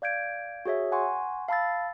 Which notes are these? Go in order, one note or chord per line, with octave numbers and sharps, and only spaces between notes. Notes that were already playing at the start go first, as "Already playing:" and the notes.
D5 F5 G6 G#6 D7
F#4 G#4 C#5 E5
F#5 G#5 C6 C#6
F5 A5 B5 E6 A6